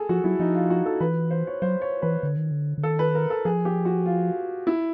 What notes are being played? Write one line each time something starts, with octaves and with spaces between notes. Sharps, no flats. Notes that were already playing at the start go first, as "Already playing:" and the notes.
Already playing: G#4 A4
F3 F#4
F#3 E4
F3 D#4
F4
F#4
A4
E3 B4
C5
C#5
F#3 C5
C#5
E3 B4
D3
D#3
D3
D3
D#3 A4
B4
A#4
A4
F3 G#4
G4
F#4
F4
E4